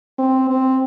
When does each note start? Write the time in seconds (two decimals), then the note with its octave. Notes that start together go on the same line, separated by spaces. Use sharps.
0.18 C4
0.50 C4